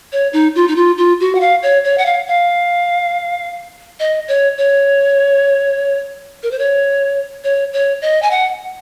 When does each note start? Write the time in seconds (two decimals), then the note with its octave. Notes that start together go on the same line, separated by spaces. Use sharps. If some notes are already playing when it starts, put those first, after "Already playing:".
0.12 C#5
0.33 D#4
0.55 F4
0.68 D#4
0.76 F4
0.98 F4
1.20 F#4
1.35 F#5
1.40 F5
1.63 C#5
1.84 C#5
1.98 F#5
2.06 F5
2.28 F5
4.00 D#5
4.28 C#5
4.58 C#5
6.43 A#4
6.51 C5
6.59 C#5
7.44 C#5
7.73 C#5
8.02 D#5
8.22 G#5
8.31 F#5